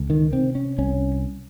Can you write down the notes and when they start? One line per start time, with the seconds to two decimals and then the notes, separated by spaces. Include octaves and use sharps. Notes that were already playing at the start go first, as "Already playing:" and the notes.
Already playing: C#2
0.10 D#3
0.32 C3 C4
0.55 C#4
0.78 C2 C#4